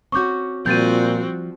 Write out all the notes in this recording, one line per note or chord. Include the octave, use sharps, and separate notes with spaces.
C4 C#4 F#4 C#6 D6 G6
A#2 F3 G3 C4 F#4 G6 A6 D#7